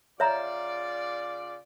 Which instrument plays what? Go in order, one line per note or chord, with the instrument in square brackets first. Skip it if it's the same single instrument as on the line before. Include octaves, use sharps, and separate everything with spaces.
[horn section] C#3 F4 D5 [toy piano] C#5 E5 A#5